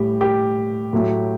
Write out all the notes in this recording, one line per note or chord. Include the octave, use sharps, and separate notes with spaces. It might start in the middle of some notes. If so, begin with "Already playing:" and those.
Already playing: A2 G3 G4
G4
A2 F#3 A3